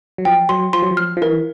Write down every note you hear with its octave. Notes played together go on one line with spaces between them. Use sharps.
F#3
F3 G5
F#3 C6
F3 C6
F#3
F3
F6
F3
E3 A#4